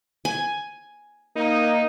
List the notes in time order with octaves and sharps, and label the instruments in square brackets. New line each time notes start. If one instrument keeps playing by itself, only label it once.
[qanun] G#5
[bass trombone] A#3 [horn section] D#4